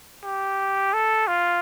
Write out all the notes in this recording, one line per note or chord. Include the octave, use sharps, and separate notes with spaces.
G4
A4
F4